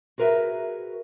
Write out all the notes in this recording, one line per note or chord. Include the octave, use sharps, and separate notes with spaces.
F#4 G#4 A#4 B4 E5